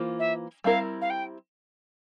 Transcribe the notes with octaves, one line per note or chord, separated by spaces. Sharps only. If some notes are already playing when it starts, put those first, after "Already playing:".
Already playing: E3 A#3 F4 C5
E5
G3 C4 E4 A#4 F5
F5
G5